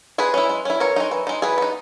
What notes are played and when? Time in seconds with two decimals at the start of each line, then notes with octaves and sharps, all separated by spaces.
0.18 G#3 G#4 B4
0.34 C#4 E4
0.49 G#3
0.65 C#4 E4
0.80 E3 A#4 C#5
0.96 G#3 D#4
1.11 E3
1.27 G#3 D#4
1.42 E3 G#4 B4
1.58 B3 D#4